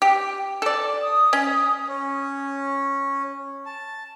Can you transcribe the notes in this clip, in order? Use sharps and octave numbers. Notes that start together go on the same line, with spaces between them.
G4
A4 D5
D#6
C#4
C#4
A5